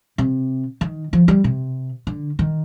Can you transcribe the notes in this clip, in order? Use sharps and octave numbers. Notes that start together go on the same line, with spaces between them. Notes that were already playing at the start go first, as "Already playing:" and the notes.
C3
D#3
F3
G3
C3
D3
D#3